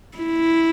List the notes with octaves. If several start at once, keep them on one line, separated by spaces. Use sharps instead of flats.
E4